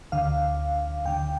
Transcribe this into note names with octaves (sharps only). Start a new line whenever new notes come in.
D2 D3 F5
D2 D3 G5